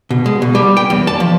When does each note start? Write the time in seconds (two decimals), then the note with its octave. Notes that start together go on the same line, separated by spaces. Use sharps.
0.11 B2
0.26 G#3
0.42 B2
0.55 G3
0.77 G5
0.90 E2
1.07 A5
1.20 F3